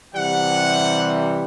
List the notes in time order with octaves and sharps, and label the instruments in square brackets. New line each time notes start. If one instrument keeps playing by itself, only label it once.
[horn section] C3 E3 G3 F#5